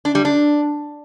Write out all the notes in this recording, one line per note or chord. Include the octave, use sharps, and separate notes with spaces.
D4
G3
D4